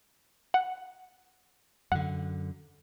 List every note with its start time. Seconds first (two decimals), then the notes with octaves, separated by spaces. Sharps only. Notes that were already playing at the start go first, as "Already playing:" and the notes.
0.54 F#5
1.92 F#2 D3 F#5